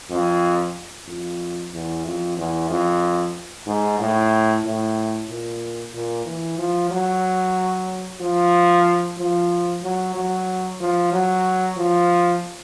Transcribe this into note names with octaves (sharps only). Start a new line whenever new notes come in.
F2
F2
E2
F2
E2
F2
G#2
A2
A2
A#2
A#2
E3
F3
F#3
F3
F3
F#3
F#3
F3
F#3
F3